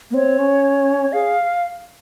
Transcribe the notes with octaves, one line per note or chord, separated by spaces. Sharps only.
A#3
C4 C#5
C#4
G#4 F5